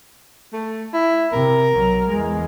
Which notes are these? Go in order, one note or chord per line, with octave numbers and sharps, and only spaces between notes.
A3
E4
C3 A#4
B1 F#3
E2 G#3